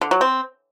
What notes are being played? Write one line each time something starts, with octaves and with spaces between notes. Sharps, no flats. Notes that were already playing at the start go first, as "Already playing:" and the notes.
D3
F#3
C4